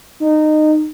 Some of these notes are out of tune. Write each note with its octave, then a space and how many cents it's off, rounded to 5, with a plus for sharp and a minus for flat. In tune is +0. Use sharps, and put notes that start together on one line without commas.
D#4 -20